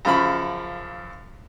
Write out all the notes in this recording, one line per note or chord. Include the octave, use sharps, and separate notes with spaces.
F#2 C#3 F3 B5